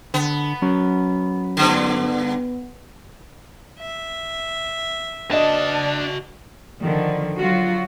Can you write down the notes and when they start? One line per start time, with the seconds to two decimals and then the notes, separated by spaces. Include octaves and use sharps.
0.14 D3 B3
0.62 F#3 C#4
1.57 G2 D3 B3
3.77 E5
5.31 D4 F#4 D5 D#5 A5
6.81 D3 D#3 F3
7.39 F#3 F4 F#4